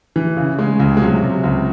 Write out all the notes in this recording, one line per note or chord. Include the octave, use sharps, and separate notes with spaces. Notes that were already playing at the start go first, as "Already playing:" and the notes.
E3
C#3
C#3 G#3
C#2
G#3
C3 F#3
C3
C#2